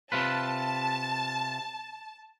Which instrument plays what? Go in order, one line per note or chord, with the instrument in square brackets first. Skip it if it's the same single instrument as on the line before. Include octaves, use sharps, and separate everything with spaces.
[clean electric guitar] C3 F4 B4 [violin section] A5